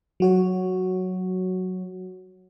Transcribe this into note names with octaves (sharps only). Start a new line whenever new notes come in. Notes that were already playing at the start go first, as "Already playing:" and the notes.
F#3 F#4 C#5